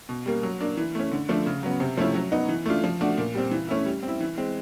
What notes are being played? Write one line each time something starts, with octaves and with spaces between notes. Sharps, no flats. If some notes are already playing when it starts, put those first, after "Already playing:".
B2
G3 A#3
F#3
A#3 D4
E3
A3 C#4
D3
F3 A3 D4
C#3
F#3 B3
C3
F3 A3 C#4 E4
F#3
B3 D#4
E3
A3 D4 F4
F3
A3 D4 F#4
A#2
G3 C4
E3
A3 C#4 E4
G3
C4
E4
E3
G#3 C4